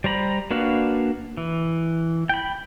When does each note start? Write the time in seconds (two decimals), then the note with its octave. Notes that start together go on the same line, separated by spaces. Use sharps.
0.04 G3 C5 A#5 B5
0.51 A#3 D4 F#4 B4 F5
1.37 E3
2.29 G5 B5